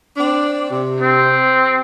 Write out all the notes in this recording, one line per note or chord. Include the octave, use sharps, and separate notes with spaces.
C4 D4 D5
C3
C4